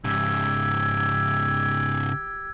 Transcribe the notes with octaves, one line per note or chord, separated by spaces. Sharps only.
G#2 C#3 G4 E6 G#6